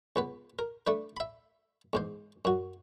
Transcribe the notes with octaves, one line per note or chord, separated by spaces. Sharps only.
C#2 B3 B4
A#4
A3 D4 B4
E5 B5
E2 G#2 C5
F#2 F#4